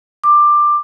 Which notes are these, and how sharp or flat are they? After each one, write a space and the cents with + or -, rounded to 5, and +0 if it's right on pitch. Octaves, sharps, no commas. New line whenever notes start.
D6 +15